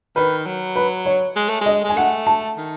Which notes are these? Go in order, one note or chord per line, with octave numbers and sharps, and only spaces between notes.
D#3 B4
F#3
B4
C#5
G#3
A3
G#3 D#5
G#3
G#5
A3 F#5
A5
D#3